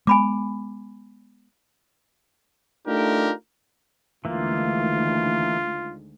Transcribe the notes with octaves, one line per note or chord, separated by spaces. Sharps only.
G#3 B3 G#5 B5 D6
A3 D4 D#4 F4 G4 A#4
D2 D#3 E3 G#3 A#3 F4